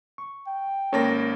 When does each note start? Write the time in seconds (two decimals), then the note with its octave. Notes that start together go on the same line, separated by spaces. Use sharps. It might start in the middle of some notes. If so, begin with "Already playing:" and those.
0.18 C#6
0.47 G5
0.93 G#1 A#3 C#4 A4 C#5 A#6